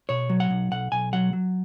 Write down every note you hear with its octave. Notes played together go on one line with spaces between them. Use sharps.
B2 C#5
F#3
F#5
B1
B1 F#5
B1 G#5
F#3 F#5
F#3